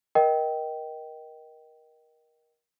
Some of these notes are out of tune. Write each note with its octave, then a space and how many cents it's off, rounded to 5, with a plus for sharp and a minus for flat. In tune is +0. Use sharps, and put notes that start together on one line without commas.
A#4 +25 D#5 +0 G5 -15